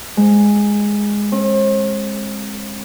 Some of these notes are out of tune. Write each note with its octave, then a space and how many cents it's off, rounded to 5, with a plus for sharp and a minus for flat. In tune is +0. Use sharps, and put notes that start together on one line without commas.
G#3 -5
C4 +45